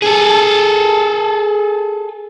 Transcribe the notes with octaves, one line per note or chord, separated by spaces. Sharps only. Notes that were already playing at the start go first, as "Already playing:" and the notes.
G#4 A4